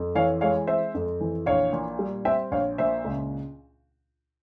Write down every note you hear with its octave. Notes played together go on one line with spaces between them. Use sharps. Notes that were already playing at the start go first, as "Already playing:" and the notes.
Already playing: F2
E3 C#5 F5
G#3 C#5 F5
C4 C5 E5
F2
E3
A#1 C#5 F5
A#2
G3
C4 E5 G5
A#1 C#5 F5
A#2 C5 E5
C#2